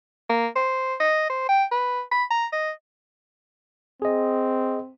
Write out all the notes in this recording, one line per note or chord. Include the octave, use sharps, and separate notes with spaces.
A#3
C5
D#5
C5
G5
B4
B5
A#5
D#5
C4 G#4 D#5